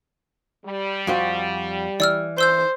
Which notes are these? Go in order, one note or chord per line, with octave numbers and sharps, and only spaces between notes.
G3
F2 F#4 C5
E3 D5 E6 F6
C5 C6 E6 G6